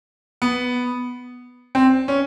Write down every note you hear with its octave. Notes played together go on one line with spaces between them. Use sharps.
B3
C4
C#4